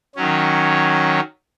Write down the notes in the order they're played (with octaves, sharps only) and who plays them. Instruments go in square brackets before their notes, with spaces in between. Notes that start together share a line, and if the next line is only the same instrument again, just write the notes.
[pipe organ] D#3 F#3 C#4